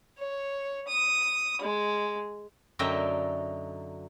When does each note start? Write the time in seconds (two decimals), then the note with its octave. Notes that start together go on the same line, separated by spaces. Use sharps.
0.18 C#5
0.88 D#6
1.61 G#3
2.79 F#2 D3 D#4 D#5 E5 G5